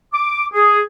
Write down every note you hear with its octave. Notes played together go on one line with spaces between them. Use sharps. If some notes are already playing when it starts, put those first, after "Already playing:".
D6
G#4